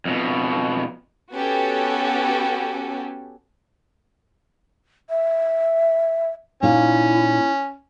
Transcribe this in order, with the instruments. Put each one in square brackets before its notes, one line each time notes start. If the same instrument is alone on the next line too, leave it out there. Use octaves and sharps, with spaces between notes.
[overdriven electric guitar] F2 B2
[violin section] B3 C#4 F#4 G4 A4
[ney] E5
[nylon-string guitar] A#2 D#4 F5 [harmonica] C#4 [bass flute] E4